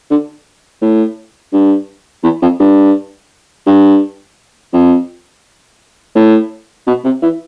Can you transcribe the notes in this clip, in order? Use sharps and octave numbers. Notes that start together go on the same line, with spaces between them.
D3
A2
G2
E2
F2
G2
G2
F2
A2
B2
C3
E3